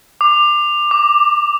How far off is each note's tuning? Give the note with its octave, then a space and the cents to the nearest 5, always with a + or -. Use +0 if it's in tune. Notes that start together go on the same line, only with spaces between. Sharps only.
D6 +25
D6 -5